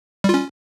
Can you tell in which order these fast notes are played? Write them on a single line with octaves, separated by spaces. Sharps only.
G3 F4 C#4